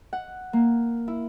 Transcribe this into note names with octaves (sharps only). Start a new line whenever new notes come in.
F#5
A#3
E4